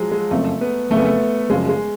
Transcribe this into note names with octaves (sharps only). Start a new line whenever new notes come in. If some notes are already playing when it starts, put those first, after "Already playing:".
Already playing: F3 F#3 G#3
G#3
F#1 F2 C#3 F3 A3
B3
F#1 F2 C#3 F3 A3
B3
A3
F#1 F#2 C#3 F3 G#3
G#3